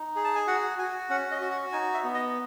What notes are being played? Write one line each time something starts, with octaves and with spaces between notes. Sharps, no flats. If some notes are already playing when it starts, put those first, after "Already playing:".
Already playing: D#4
G#4
A5
G#5
F#4 F#5
F#4 G#5
C#4 F#5
D#5
F#4
F#5
D#4 G#5
E5
B3
D#5